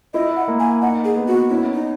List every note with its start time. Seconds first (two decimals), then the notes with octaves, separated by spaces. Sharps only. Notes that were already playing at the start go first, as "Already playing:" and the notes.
0.14 E4 D#5
0.36 F#5
0.48 A#3
0.60 G#5
0.82 D#4 F#5
1.04 G#4
1.16 B3
1.28 F#4
1.50 C#4 E4
1.73 D#4